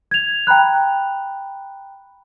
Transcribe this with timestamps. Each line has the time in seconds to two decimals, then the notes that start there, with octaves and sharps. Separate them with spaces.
0.11 G#6 F7
0.47 G5 A#5 B5 F#6